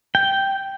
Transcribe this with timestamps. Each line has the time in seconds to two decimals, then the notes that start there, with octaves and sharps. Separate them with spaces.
0.15 G5